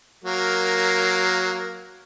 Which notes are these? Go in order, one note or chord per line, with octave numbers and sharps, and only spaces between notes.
F#3 A#3 A#4